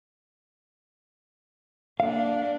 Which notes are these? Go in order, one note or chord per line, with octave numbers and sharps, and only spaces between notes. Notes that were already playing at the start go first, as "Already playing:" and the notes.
A#3 D4 F5